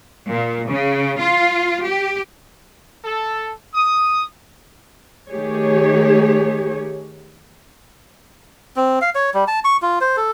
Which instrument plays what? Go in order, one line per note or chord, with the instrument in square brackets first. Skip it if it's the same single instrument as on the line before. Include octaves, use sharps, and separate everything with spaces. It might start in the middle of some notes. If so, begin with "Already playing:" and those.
[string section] A#2
C#3
F4
G4
[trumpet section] A4
D#6
[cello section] D#3 A3 G4 G#4 C#5
[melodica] C4
F5
C#5
G3
A5
C#6
F4
C5
A4